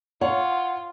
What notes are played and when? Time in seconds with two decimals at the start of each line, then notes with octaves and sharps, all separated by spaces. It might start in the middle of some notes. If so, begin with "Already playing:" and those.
0.21 F4 C#5 F#5